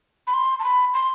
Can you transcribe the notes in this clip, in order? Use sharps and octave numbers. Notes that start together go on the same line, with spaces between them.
B5
C6
A5
B5
C6